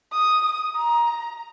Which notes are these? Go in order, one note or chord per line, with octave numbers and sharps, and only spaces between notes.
D#6
A#5